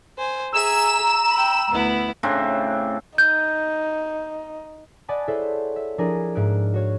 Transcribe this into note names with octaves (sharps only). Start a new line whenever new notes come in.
C5 G#5
G#4 E5 G#5 A#5 E6 E7
G5 B5
D2 B3 E4
A2 C#3 C4 D4
D#4 G6
D5 D#5 F#5 G#5 A5 B5
E4 G#4 A4 C5 C#5 E5
E5
F3 D4 E4 F4 G#4 A#4
G#2 E5 F5 F#6 D7
F#4 C#5 F5